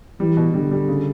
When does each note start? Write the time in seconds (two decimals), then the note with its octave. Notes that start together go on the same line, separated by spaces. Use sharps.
0.20 E3 G3
0.37 B2
0.54 D3 G3
0.71 G3
0.88 C#3